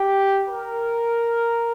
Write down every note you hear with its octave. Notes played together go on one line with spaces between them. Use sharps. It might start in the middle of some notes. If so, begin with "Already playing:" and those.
Already playing: G4
A#4